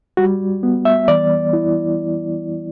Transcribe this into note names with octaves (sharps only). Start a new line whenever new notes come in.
G3 F#4
B3
E5
E3 D5
E4